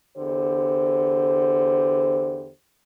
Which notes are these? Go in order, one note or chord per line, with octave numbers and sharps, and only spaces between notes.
E2 D3 G4 C5